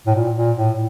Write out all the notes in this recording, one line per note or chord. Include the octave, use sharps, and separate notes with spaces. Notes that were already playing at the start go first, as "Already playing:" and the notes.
A2
A#2
A#2
A2